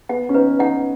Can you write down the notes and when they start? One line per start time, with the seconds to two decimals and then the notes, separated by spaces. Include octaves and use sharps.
0.09 B3 F#5
0.29 C#4
0.34 D#4 B4
0.59 D#4 F#5